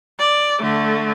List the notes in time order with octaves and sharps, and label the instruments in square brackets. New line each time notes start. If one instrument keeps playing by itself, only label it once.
[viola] D5
D3 A3